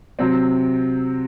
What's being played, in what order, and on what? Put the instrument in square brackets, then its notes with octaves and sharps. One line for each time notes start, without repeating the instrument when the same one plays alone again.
[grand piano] C3 F#3 C4